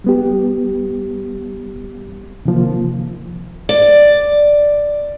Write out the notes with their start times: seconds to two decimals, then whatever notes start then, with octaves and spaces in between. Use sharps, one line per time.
0.04 G3 B3 G4
2.45 C3 D#3 F3 A#3
3.69 D5